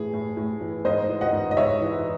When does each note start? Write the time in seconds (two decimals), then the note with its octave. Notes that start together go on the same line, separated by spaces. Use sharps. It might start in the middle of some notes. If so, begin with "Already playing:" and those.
Already playing: A2 E3 G#4
0.13 A2
0.37 A2
0.61 E3
0.85 G#2 C5 D#5
1.09 E3
1.21 D#5 F#5
1.33 G#2
1.51 D#5
1.57 G#2 C#5 E5
1.81 E3